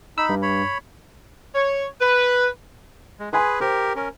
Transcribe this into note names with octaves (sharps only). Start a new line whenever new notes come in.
D#4 B5 E6
G2
C#5 B5
C#5
B4
G#3
G#4 B4 G#5 B5 C6
G4 A#4 C5
C#4 A#4